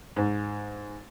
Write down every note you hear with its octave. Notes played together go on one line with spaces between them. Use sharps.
G#2